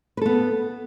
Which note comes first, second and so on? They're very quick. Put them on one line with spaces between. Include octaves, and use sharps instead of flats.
B4 A4 B3